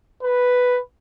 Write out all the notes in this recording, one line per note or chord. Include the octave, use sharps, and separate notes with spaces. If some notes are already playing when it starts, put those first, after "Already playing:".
B4